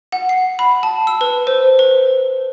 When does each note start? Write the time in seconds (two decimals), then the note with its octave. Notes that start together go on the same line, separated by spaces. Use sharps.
0.12 F#5
0.29 C7
0.59 B5
0.83 A5
1.07 E6
1.21 B4
1.47 C5
1.79 B4